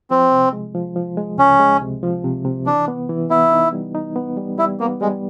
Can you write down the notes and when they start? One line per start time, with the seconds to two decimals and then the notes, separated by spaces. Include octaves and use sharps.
0.11 F3 C4
0.32 C3
0.53 G#3
0.75 F3
0.96 F3
1.17 G#3
1.38 C#2 C#4
1.60 G#3
1.82 C3
2.03 F3
2.24 C3
2.45 C3
2.66 E3 D4
2.88 B3
3.09 E3
3.30 B3 E4
3.52 D#4
3.73 G3
3.95 D#4
4.16 B3
4.37 G3
4.58 G3 E4
4.80 A#3 B3
5.01 G3 G#3